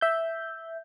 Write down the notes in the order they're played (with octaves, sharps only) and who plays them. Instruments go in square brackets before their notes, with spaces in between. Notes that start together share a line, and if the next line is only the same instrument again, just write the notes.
[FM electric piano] E5 G6